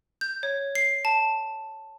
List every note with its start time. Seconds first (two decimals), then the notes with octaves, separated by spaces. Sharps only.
0.21 G6
0.43 C#5
0.75 C7
1.05 A5